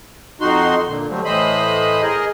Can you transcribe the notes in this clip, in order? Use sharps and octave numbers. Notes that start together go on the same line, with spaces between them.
F2 D#4 F#4 C6
A#2 D3
D3 F#3 G3 A3 C4
A2 E3 C5 D#5 B5
G#4 A#4 D#5